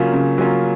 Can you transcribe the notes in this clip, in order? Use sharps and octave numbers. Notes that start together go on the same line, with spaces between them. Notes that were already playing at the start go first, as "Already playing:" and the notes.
Already playing: C#3 F#3 A#3 C#4 F4
C#3
F#3 A#3 C#4 F4